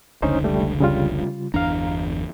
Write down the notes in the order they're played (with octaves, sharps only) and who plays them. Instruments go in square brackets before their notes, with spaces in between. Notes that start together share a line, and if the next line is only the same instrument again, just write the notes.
[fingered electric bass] F1 C#2 D3 [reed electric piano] C#4 D#4 C5
[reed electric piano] G3 A3
C#3 G3 F4
[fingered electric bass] G1 E2 D4 [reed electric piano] F5 A#5